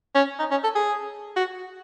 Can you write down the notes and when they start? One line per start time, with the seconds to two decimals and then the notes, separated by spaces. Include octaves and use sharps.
0.15 C#4
0.39 D#4
0.51 C#4
0.64 A4
0.75 G#4
1.36 F#4